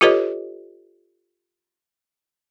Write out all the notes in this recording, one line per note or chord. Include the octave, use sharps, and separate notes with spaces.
F4 G4 A4 B4 C#5 D#5